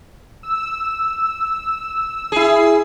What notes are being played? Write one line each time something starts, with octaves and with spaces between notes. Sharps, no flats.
E6
E4 G#4